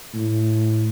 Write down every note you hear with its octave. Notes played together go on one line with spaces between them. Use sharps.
A2